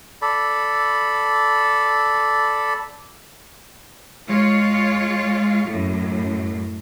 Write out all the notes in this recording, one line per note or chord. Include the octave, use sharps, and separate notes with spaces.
A4 D5 B5
G#3 F4 C#5
F#2 A2